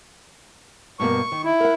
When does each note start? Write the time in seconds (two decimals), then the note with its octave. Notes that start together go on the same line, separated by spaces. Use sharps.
1.00 G2 B2 A#3 C#6
1.32 D#3
1.44 E4
1.60 A#4 F#5